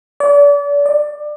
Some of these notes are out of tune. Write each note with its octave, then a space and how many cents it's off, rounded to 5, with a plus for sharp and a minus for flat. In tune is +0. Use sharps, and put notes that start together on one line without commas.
D5 -35
D5 +20